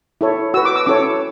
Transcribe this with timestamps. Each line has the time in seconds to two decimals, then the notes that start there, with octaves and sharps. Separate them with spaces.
0.21 E4 A4 C#5
0.54 F#4 E6
0.57 B4
0.65 D6
0.76 E6
0.86 C#4 E4 A4 C#5 D6